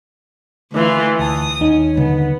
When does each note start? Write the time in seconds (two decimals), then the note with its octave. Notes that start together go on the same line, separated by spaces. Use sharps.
0.73 D2 E3 F4
1.19 D2 A5 D#6
1.61 D#2 C#4 D#4
1.97 D3 A#3 B3